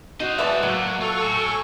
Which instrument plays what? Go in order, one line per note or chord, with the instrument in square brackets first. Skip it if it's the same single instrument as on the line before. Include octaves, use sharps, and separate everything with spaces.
[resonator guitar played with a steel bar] D#4 [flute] F#4 [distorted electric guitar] C5 D#5
[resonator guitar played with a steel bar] G#3 B4 E5 [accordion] D5 A5
[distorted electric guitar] A2 A3 [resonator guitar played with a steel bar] F#3 [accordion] A#3
[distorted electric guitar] F4 [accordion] A4 C#6
[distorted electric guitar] A2 [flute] G#5